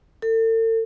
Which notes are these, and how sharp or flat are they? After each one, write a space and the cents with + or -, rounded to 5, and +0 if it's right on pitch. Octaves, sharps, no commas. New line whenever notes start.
A4 +40